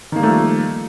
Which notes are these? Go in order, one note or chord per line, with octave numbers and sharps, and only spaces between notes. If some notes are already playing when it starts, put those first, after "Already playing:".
D#3 F3 G3 A3 A#3